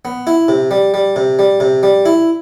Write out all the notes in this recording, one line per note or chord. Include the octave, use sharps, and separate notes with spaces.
B3
E4
C3
G3
G3
C3
G3
C3
G3
E4